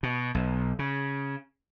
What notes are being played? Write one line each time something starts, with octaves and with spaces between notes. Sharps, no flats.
B2
B1
C#3